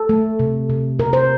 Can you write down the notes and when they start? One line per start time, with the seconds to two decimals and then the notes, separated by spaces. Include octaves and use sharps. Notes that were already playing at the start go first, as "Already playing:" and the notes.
Already playing: A4
0.09 A3
0.40 C3
0.70 C3
0.99 C3 A#4
1.13 C5